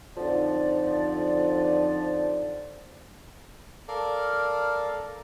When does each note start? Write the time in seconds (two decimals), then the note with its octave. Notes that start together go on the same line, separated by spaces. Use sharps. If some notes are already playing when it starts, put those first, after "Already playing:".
0.17 F2 D3 F3 D#4 D5
3.88 A4 A#4 D5 F5